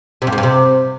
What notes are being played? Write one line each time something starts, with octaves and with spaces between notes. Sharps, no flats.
C3
G2
G#2
G2
C3